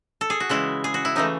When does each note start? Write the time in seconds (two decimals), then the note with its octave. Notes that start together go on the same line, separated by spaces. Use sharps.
0.21 A4
0.30 G#4
0.40 F#4
0.49 C#3 E3 G#3 E4
0.84 G#4
0.94 F#4
1.05 E4
1.15 C#3 E3 A3 D#4